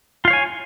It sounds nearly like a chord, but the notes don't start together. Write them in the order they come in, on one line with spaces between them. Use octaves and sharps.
F4 F5 C#5 G#5